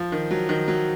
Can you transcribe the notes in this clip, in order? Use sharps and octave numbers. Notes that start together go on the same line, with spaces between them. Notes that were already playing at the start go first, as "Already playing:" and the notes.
Already playing: F3
D#3
F#3
D#3
F#3